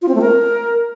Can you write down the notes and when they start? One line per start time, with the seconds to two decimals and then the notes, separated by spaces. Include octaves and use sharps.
0.02 F4
0.08 C4
0.15 A3
0.21 A#4